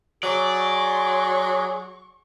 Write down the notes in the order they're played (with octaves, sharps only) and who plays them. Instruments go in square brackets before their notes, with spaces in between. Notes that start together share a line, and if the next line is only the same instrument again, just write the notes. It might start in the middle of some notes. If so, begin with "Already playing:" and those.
[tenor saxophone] F#3 [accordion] G#4 [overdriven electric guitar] D5 [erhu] C#6